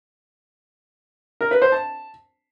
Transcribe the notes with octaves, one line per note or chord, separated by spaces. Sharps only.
A#4
B4
C5
A5